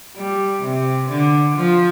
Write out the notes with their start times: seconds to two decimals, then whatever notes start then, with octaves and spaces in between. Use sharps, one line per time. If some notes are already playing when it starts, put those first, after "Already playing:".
0.16 G3
0.62 C3
1.09 D3
1.57 F3